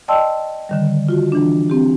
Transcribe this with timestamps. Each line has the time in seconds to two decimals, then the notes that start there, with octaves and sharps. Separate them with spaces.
0.08 D5 D#5 G5 A5 C6 E6
0.69 D3 D#3 G3
1.09 F4 F#4
1.32 E3 D4
1.70 C4 G4